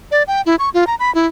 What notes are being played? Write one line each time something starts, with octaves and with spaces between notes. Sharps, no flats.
D5
G5
E4
C#6
F4
A#5
B5
E4